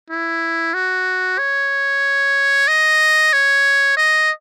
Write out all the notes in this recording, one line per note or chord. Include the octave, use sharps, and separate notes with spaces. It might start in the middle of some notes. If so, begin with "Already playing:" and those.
E4
F#4
C#5
D#5
C#5
D#5